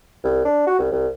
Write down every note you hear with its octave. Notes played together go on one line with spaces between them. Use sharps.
C2
D4
F#4
C2
C2